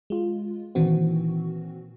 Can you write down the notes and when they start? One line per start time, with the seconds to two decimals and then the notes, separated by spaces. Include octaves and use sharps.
0.10 G#3 F4
0.75 A#2 D#3 E3 C4 F#4